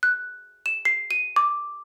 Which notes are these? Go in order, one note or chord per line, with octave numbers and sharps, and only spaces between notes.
F#6
E7
C7
D#7
D6